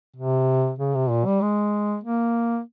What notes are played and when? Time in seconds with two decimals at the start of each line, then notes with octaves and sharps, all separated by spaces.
0.17 C3
0.79 C#3
0.94 C3
1.10 A#2
1.26 G3
1.41 G#3
2.04 A#3